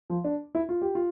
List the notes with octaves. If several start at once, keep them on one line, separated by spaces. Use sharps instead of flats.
F3
D4
E4
F4
G4
F4